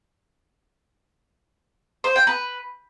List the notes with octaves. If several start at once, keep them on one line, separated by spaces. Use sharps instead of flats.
C5
G5
B4